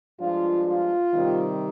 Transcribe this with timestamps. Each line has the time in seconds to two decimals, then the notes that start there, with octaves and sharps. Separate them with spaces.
0.21 G2 F3 G#3 D4 F4
0.66 F4
1.11 C3 D#3 G3 C4